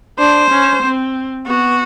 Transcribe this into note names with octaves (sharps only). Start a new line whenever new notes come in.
D4 C5
C#4
C4
B3 F#4